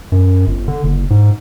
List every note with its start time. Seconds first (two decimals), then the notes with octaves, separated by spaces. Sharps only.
0.12 F#2
0.47 G1
0.68 D3
0.84 F#1
1.10 G#2